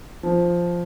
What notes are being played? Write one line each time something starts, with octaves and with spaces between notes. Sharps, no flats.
F3